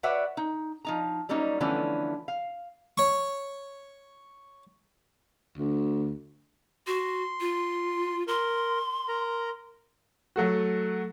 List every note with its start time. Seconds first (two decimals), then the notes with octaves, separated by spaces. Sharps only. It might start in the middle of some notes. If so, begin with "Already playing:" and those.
0.03 F#4 B4 C#5 D5 E5 F#5
0.37 D#4
0.85 F3 D#4 A#5
1.29 F#3 G3 A#3 C#4 D#4
1.60 D3 E3 F3 A3 B3 C#4
2.28 F5
2.98 C#5 C#6
5.58 D2
6.87 F#4 C6
7.40 F4
8.28 A#4 C6
9.08 A#4 A#5
10.36 F#3 A3 F#4